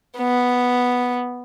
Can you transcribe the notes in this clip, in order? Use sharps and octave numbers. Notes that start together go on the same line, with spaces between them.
B3